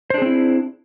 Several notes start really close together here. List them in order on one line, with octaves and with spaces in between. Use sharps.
C5 D4 G#4 C4 E4